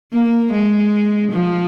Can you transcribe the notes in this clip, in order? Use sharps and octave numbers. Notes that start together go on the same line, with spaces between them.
A#3
G#3
F3